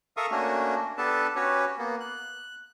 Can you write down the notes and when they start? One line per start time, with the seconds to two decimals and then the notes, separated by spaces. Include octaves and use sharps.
0.17 A4 A#4 E5 F5 C#6 D#6
0.31 A3 A#3 C#4 D4 F#4
0.98 B3 D4 G4 A4 B4 A5
1.36 C#4 F#4 G4 B4 C#5
1.78 A#3 B3
2.00 F#6